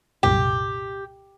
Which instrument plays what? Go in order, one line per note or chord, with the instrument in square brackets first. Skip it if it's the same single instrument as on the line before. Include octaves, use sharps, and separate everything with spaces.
[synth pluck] C2 F#2 A#2 [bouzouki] G4